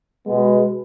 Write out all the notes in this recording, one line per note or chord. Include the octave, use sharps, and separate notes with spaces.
B2 G#3 B3